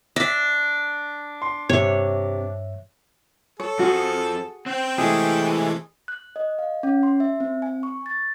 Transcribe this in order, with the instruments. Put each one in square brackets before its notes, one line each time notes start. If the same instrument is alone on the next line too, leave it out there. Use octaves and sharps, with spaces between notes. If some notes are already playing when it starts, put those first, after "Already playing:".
[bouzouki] D4 [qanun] E5 [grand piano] A#6 B6
[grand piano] C6
[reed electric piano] G2 E5 [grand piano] C3 [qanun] C#5
[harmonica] A4 [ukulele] C#5
[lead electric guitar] F2 [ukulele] F#4 G#4
[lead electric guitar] C4 [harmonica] G5
[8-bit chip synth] C3 G#3 A3 [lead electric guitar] E3 [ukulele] G#4
[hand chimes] F#6
D#5
F5
C#4
C6
E5
C4
G#5
C#6
A6